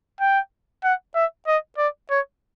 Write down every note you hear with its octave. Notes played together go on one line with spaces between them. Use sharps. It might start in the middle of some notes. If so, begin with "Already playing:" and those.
G5
F#5
E5
D#5
D5
C#5